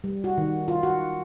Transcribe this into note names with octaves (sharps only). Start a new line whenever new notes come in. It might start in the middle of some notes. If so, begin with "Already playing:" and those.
G3
F#4
D#3
F4
F#4